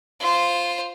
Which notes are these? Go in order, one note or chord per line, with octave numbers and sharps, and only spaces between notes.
F4 C5